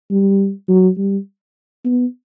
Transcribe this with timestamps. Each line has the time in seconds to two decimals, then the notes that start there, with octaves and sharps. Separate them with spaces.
0.11 G3
0.68 F#3
0.97 G3
1.85 B3